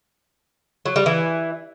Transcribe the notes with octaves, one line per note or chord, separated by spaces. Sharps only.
F#3
G3
E3